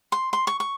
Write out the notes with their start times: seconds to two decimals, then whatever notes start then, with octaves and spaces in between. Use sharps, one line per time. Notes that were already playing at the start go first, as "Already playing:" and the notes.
0.12 C6
0.33 C6
0.47 C#6
0.60 C#6